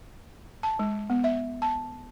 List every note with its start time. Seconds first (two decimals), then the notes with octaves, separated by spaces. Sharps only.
0.63 A5
0.79 G#3
1.10 B3
1.24 E5
1.62 A5